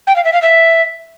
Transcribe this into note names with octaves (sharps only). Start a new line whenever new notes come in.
G5
F5
E5
F5
E5